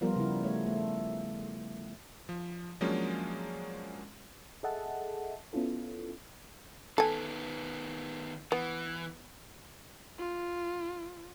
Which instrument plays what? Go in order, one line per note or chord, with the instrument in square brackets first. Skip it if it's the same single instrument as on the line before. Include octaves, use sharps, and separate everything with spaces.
[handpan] F3 G3 B3 F4 A#4
C#3 E4
A3 C#5
A3
[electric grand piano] F3
F3 F#3 G#3 A#3 C#4 D4
[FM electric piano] G#4 A4 D#5 E5 F#5 A5
B3 C#4 E4 F4 A4
[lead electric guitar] D#3 B3 [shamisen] A4 G#5
[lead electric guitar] E3 [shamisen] B3
[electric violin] F4